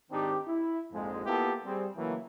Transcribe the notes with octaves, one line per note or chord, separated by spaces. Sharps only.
G#2 D#3 C4 D4 D#4 G4
E4
A#1 F2 G#2 F3 G#3
A#3 B3 E4 F4 G4 A4
G3 C4 G#4
C#2 E3 F#3 A3 A#3